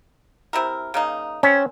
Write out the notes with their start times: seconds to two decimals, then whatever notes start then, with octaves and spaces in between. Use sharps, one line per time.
0.53 C3 E4 A#4
0.94 C#3 A#3 D#4
1.43 C4 C#4